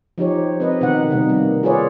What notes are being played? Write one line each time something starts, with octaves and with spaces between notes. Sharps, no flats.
F3 D#4 G4 C#5
C4 B4 D#5
B2 D#3 D#4 B4 F#5
C3 D#3 G3 A#3
A#3
F4 G#4 B4 C#5 D5